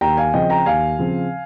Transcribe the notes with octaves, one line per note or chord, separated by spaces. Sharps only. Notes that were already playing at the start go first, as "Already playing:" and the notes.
D#2 G5 A#5
F5 G#5
C#3 F3 C4 D#5 G5
G5 A#5
D#2 F5 G#5
C#3 F3 C4